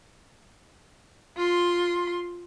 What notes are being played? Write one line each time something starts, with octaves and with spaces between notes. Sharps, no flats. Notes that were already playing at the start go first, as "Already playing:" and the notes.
F4 C6